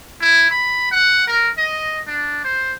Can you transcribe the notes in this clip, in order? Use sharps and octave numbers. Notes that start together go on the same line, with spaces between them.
E4
B5
F#5
A#4
D#5
D4
C5